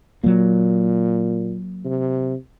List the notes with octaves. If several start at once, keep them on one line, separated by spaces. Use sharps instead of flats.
A#2 F#3 A#3
C3